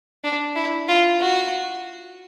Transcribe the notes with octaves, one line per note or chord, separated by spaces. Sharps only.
D4
E4
F4
F#4